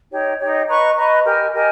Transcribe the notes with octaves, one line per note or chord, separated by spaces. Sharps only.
D#4 G4 C#5
D#4 G4 C#5
B4 D#5 A#5 C#6
B4 D#5 A#5 C#6
G4 A#4 D#5 G#5
G4 A#4 D#5 G#5